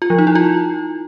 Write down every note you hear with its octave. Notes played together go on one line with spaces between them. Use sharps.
F4
F3
D#4
E4
F4